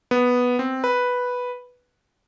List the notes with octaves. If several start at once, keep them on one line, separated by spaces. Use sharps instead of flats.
B3
C4
B4